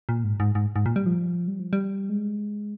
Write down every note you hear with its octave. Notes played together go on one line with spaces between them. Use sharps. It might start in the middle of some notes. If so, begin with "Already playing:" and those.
A#2
G#2
G#2
G#2
G#2
A#2
G3
F3
G3
F3
G3
G#3